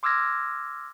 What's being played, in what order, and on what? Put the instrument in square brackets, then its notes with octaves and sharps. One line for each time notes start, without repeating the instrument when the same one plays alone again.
[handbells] C6 D6 E6 F6 G#6 A#6